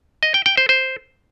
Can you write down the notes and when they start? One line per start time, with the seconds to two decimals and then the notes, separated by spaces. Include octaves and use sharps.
0.23 D#5
0.34 G5
0.46 G5
0.57 C5
0.69 C5